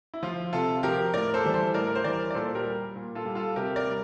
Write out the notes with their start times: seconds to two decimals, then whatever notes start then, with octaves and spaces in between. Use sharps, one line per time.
0.14 E4
0.23 F3 F4
0.53 C3 F4 A4
0.83 F3 G4 A#4
1.14 A2 A#4 D5
1.34 A4 C5
1.44 E3 G3
1.54 A4 C5
1.74 A2 A#4 D5
1.87 A#4
1.95 C5
2.04 E3 G3 A#4 D5
2.30 D5
2.34 A#2 A4 C5
2.55 G4 A#4
2.65 G3
2.96 A#2
3.15 F4 A4
3.26 G3
3.35 F4 A4
3.56 C3 G4 A#4
3.76 A#4 D5
3.86 G3